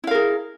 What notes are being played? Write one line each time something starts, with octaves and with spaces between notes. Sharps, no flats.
E4 G#4 A#4 F5